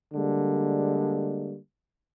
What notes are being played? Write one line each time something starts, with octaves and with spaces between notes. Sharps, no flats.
D3 G3 G#3 A#3